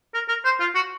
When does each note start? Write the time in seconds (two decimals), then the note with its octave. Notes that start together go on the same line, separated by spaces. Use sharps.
0.14 A#4
0.29 A#4
0.45 C5
0.60 F4
0.75 F#4